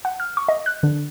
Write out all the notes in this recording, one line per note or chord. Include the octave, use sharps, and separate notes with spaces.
F#5
F6
C#6
D#5
F#6
D3